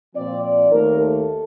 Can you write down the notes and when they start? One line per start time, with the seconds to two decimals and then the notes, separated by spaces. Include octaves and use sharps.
0.14 A#2 F3 C4 D5
0.43 D5
0.70 D#2 D#3 A3 A#4
0.99 A4